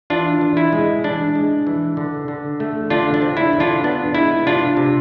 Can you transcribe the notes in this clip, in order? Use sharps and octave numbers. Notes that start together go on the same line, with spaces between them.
E3 D4 F4
E3
E4
G#3
E3 D4
G#3
E3
D3
D3
A3
D3 D4 F4
D4
C4
E4
D3
D4 F4
B3 D4
G#3 E4
C3 D4 F4
C3